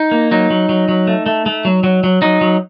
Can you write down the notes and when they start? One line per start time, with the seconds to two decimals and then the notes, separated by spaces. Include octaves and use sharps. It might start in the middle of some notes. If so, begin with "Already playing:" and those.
Already playing: D#4
0.11 A#3
0.31 F#3 D#4
0.50 F#3
0.69 F#3
0.89 F#3
1.07 A3
1.26 A3
1.46 A3
1.65 F#3
1.84 F#3
2.04 F#3
2.22 F#3 D#4
2.41 F#3